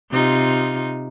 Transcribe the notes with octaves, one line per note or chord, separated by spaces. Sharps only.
C3 D#4 F4